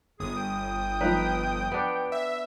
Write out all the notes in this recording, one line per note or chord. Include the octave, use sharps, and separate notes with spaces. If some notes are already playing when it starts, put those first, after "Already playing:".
G1 G#4 D#6
G5
F3 D#4 B4
B3 D4
E5